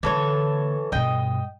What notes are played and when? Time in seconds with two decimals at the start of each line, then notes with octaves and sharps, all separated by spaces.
0.03 D3 E3 A#3 A4 C#5
0.92 G2 B2 D#5 G5